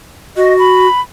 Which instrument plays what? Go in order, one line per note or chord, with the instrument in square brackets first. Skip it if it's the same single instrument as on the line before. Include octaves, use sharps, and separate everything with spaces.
[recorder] F#4 [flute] D#5
[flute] B5